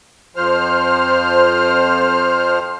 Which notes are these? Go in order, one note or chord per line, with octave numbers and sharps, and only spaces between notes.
F2 F3 C5 F6